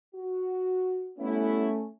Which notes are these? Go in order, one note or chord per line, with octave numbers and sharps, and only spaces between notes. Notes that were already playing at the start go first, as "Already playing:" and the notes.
F#4
G3 A3 B3 C#4 E4